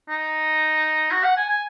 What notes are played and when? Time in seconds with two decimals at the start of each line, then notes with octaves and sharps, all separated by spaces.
0.09 D#4
1.12 F#4
1.24 F#5
1.37 G#5
1.49 G#5